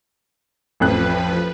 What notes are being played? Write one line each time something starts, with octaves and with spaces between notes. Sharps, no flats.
A1 F2 F3 B4 F#6